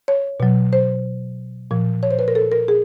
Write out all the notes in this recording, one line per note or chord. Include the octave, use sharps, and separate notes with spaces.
C#5
B2 F#3
C5
A#2 F3
C#5
C5
B4
A#4
A4
A#4
G#4